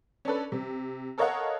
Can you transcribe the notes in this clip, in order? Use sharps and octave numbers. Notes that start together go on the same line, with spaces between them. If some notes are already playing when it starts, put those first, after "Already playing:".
C#4 D4 A4 B4
C3
A4 A#4 C#5 D#5 F5 F#5